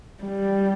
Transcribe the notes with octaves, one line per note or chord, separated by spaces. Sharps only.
G3